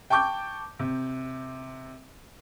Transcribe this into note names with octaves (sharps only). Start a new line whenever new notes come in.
G5 A5 C#6 D6 G6
C3